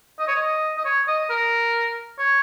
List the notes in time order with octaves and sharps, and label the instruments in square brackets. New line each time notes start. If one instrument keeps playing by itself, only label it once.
[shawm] D#5
C#5
D#5
D#5
C#5
D#5
A#4
C#5